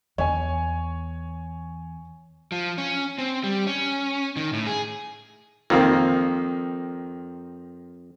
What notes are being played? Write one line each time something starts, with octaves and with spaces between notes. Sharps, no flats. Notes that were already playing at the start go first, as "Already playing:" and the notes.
E2 C#5 G#5
F3
C#4
C4
G3
C#4
D#3
A2
G#4
F2 D#3 A#3 C4